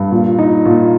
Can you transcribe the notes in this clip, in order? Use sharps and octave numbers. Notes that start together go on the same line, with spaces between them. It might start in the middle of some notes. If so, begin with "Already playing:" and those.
Already playing: G2
A#2
D#4
A#2